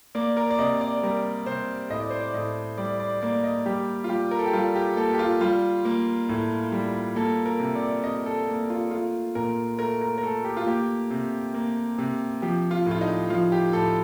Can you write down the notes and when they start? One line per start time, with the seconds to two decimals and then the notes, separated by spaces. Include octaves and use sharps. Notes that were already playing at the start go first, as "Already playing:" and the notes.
0.15 A#3 D5
0.37 A#4
0.51 D5
0.59 C3 D#5
0.81 D5
1.03 G3 A#4
1.46 C3 C5
1.90 A2 D#5
2.00 D5
2.10 C5
2.20 D5
2.34 A2 D#5
2.78 G3 D5
3.00 D5
3.22 A#3 D5
3.44 D#5
3.66 G3 G4
4.04 F4
4.09 G3 G4
4.31 A#4
4.39 A4
4.46 G4
4.53 G3 F4
4.75 G4
4.97 A#3 A4
5.14 G4
5.19 F4
5.41 G3 F4
5.85 A#3
6.29 A2
6.72 G3
7.16 A#3 A4
7.46 A#4
7.60 C3
7.75 D5
8.03 C3 D#5
8.26 A4
8.48 A#3
8.70 F4
8.91 A3 F4
9.35 A#2 A#4
9.79 A3 A#4
10.01 A#4
10.18 A#4
10.23 A3 A4
10.45 G4
10.57 F4
10.66 A#3 G4
11.11 C3
11.54 A#3
11.98 C3
12.42 F3 G4
12.71 F4
12.86 A2 F4
13.01 D#4
13.30 F3 F4
13.52 G4
13.73 A2 A4